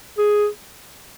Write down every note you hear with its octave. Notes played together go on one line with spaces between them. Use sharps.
G#4